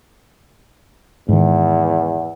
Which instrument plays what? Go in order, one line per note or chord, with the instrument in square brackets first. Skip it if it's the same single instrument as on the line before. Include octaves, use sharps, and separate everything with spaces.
[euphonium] E2 [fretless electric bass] G#2 D#3